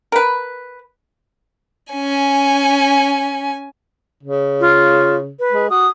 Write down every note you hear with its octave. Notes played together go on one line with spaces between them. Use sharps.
A#4 B4
C#4 G#5
C#3
F4
B4
G#3
F#4 D#6